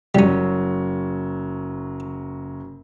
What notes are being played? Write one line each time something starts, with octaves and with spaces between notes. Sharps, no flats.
F#1 F#3 G3 C#4